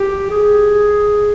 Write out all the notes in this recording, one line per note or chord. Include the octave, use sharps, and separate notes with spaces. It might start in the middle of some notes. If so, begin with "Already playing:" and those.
Already playing: G4
G#4